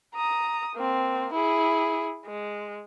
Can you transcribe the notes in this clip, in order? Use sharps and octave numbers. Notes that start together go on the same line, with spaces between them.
A#5 D#6
A#3 C4
E4 G#4
G#3